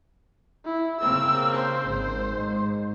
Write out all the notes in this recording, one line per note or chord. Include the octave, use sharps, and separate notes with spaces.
E4
C#3 A#3 C4 E6
C5
G#1
G#2